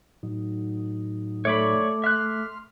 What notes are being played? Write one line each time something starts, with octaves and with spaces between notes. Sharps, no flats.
A2 F#3 D#4
A3 C#5 D5 B5 D6
E5 C6 F6 F#6